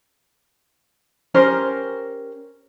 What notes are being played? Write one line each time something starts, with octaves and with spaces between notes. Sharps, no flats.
C#4 G4 A#4 C5